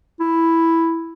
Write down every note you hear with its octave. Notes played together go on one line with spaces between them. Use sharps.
E4